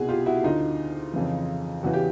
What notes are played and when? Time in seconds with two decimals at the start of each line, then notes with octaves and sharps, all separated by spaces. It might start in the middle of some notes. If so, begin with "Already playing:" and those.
Already playing: C2 B2 F#4 G#4
0.09 F4 G4
0.26 E4 F#4
0.44 D2 D3 D#4 F4
1.14 F2 C#3 E3
1.83 E2 C#3 E3 F#4
1.93 G4